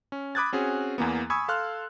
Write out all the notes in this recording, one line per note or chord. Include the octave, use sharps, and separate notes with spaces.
C#4
B5 D6 D#6 F#6 G#6 A6
C4 C#4 F#4 G#4
E2 E3 A#3 B3
G#5 B5 C#6 D#6 E6 G#6
A4 F5 C6 F6 F#6